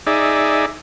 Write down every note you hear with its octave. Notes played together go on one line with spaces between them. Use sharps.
D#4 G#4 D5 E5